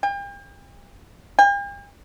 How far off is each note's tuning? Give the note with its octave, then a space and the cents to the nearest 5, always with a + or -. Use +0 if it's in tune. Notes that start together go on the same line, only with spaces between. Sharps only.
G5 +40
G5 +45